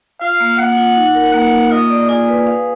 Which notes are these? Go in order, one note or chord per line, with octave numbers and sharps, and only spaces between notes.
F4 F5
A#3
A#3 F#5
F4
D#4
A#4
A#3 F#5
A#3
F4 D#5
D5
F4 G#4
B4
F5